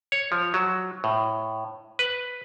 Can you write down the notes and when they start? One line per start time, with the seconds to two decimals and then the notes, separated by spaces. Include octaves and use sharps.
0.12 C#5
0.32 F3
0.54 F#3
1.04 A2
1.99 B4